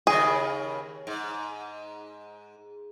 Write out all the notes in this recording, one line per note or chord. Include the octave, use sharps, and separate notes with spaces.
D#2 C#3 G#4
G#2